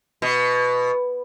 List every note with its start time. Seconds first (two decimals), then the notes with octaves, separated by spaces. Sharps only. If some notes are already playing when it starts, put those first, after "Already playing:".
0.22 B2